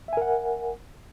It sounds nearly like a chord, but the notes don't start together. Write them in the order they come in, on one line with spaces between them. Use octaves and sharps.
E5 G#5 A#4 F#5